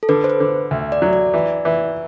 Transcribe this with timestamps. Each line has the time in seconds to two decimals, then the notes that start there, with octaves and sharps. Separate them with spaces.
0.03 A4
0.09 D3 B4
0.24 C5
0.30 B4
0.40 D3
0.71 D2
0.92 D5
1.02 F#3
1.13 D5
1.34 E3
1.65 E3